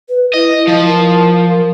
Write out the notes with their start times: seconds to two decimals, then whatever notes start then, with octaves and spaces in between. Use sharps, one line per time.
0.09 B4
0.34 E4 D#5
0.67 F3
0.87 A#4